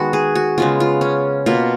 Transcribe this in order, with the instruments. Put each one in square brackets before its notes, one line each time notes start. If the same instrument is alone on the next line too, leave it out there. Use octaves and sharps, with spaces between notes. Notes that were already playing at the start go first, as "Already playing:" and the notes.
Already playing: [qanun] D#3 G#3 B3 F#4
G#4
F#4
C#3 G#3 B3 F4
F4
C#4
B2 A#3 F4